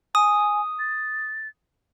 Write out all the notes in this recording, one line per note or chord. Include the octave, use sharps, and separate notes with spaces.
G#5 D#6
A6